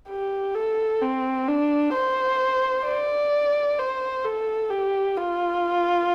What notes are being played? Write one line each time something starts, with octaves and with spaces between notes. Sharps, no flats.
G4
A4
C4
D4
C5
D5
C5
A4
G4
F4